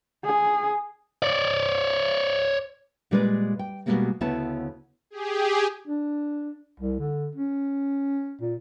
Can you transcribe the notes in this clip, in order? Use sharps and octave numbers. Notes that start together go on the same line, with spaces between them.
G#4
C#5 D5
A#2 G3 G#3 B4 C#5 D5
G5
B2 D3 G3 G#3 A#3 B3
D2 C#3 B3 E4 C#5 A5
G4 G#4
D4
C2
D3
C#4
A#2